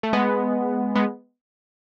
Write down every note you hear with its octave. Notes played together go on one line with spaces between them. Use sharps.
A3
G#3 B3
G#3 B3